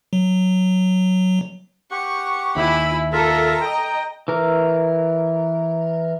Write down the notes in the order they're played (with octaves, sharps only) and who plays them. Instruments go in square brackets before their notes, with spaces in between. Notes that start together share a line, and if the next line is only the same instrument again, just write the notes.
[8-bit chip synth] F#3
[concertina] G4 F#5 [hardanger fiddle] C#6
[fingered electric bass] D#2 [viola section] E4 [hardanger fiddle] G#5 B5
[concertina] F4 A#4 E5 [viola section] A4 [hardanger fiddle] A#5
[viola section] D#5 [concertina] G5
[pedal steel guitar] E3 A#4